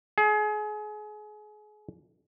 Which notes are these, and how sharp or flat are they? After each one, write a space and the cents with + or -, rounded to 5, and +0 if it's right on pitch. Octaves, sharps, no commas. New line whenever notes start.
G#4 +30